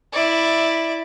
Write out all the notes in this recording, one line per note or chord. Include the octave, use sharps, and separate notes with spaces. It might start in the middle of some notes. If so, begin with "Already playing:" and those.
E4 D5